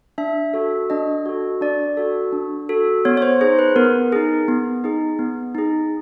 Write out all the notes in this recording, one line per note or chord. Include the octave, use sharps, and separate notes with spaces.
D4 E5
F#4 A4
D4 D#5
F#4 A4
D4 D5
F#4 A4
D4
F#4 A4
B3 C#5
C#5
C5
D#4 G#4 C5
B4
B3 A#4
D#4 G#4
B3
D#4 G#4
B3
D#4 G#4